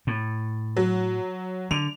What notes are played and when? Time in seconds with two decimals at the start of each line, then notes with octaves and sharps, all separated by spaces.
0.07 A2
0.77 F#3
1.71 D3 F7